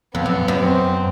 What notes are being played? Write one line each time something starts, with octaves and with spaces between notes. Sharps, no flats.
F2 B3
F#2
F#2
C4